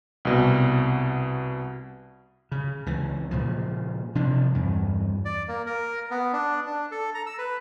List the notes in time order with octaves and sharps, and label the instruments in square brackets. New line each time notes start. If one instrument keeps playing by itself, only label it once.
[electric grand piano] C2 B2
[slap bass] C#3
C#2 E3
A#2 C#3 F3
C3 F3 D4
E2 G2
[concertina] D5
A#3
A#4
B3
D4
D4
A4
A#5
E6
B4